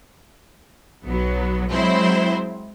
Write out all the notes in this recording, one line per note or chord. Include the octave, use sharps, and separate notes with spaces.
B1 F#3 B3
F#3 G#3 C4 E4 C5